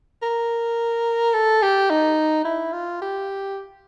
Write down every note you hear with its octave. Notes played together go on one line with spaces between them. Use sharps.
A#4
A4
G4
D#4
E4
F4
G4